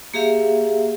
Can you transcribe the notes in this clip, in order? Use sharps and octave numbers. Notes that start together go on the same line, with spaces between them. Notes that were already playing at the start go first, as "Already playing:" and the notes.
A#3 G4 G#4 E5 F5